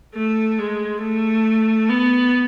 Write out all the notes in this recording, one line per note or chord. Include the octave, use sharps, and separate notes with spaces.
A3
G#3
A3
B3